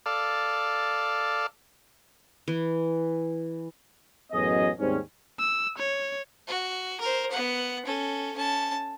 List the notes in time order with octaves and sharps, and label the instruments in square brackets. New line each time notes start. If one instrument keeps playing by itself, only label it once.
[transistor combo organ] A4 D5 F5
[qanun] E3
[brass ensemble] A1 F#2 F#3 B3 G#4 D#5
D#2 G#2 G3 C4 C#4
[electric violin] E6
C#5
[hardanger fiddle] F#4
A#4 C5
B3 F#5
C#4 A4
C#4 A5